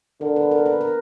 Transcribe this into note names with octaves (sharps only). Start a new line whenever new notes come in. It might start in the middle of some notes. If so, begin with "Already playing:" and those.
D3 A#4
B4
A#4
B4
A#4